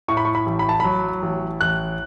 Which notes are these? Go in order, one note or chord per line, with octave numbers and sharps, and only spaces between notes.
A2 C#6
B5
C#6
B5
A1
B5
A5
F#3 B5
A1
A1 F#6